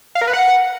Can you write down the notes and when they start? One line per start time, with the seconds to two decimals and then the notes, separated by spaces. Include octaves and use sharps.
0.15 F5
0.21 A#4
0.27 B4
0.33 F#5